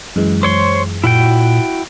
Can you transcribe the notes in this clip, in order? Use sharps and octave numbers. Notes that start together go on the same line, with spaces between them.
F#2 E3 G#3
C5 C#5 C6
A#2 E4 F#4 G5